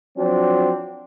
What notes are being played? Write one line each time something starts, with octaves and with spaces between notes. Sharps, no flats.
F3 F#3 C4 D4